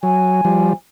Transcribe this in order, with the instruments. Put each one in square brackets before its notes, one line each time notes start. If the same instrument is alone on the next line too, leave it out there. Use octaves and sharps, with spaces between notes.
[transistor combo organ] F#3 [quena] G#5
[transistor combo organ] F3 G3